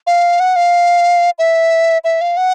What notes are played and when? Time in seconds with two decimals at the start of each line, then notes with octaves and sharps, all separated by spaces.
0.07 F5
0.40 F#5
0.56 F5
1.39 E5
2.04 E5
2.21 F5
2.37 F#5